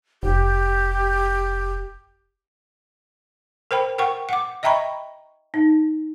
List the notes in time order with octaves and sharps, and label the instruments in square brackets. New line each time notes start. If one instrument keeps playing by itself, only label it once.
[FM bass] F1 [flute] G4
[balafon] A#4 C5 G5 B5
A#4 F#5 G5 C#6
F#5 D6
D#5 E5 G5 A#5 B5 C#6
D#4